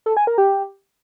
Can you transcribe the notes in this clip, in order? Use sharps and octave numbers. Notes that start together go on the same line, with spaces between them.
A4
G#5
A#4
G4